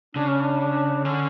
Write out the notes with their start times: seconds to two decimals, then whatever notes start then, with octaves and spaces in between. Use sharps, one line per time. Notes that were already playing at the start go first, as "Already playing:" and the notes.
0.15 C#3 D4
0.29 C#4
0.42 D4
0.60 D4
1.04 D3 C#4